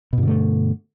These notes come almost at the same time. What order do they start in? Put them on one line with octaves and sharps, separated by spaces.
B2 G2 D3 A3